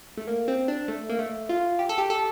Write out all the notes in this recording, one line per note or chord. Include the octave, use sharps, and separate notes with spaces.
A3
A#3
C4
D4
A3
A#3
A3
F4
G4
A4
G4
A4